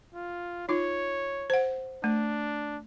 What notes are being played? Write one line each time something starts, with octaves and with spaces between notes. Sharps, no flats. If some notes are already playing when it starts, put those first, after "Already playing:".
F4
D#4 F4 C#5
C5 F#5
A3 D4